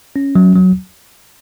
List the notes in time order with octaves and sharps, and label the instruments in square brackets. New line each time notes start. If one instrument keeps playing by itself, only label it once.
[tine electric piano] C#4
F#3
F#3